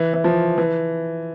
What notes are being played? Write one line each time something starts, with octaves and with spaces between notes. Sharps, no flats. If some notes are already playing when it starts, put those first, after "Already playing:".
Already playing: E3
E3
F3
E3